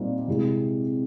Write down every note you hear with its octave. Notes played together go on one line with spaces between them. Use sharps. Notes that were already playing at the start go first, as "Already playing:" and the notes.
Already playing: A#2 G3 C4 D#4
C3 E3 G#3